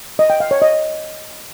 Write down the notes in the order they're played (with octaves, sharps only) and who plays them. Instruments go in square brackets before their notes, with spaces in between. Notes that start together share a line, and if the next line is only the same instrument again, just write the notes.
[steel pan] D#5
G5
F5
C#5
D#5